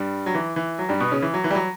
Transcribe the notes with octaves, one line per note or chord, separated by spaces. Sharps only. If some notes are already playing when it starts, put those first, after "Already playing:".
Already playing: G2 G3
F#3
E3
E3
F#3
G2 G3
B2 B3
C#3 C#4
E3
F#3
E3
G3
F#3